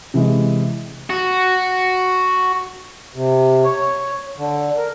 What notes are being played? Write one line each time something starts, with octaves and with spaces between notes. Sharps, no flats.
C3 E3 G#3
F#4
C3
C#5
D3
A#4